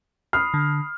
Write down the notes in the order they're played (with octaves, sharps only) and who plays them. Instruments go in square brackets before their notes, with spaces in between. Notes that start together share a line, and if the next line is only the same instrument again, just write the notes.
[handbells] B5 D#6 C7 [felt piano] F6
[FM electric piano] D3